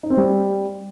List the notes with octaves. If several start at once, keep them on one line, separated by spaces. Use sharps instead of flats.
D#4
C4
G3